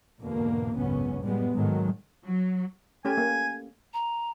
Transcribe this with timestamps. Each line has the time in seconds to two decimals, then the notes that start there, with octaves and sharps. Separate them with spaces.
0.21 E2 G#2 B2 D3 A#3
0.77 G#1 C#2 F#2 B3 C#4
1.23 F#2 A2 G3 G#3 B3
1.53 G#2 D#3 F#3 G#3 A3
2.23 F#3
3.05 A3 C#4 G4 G#5
3.17 A#3
3.94 A#5